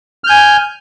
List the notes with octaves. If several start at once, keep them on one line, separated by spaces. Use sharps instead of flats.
G#5 F6 G6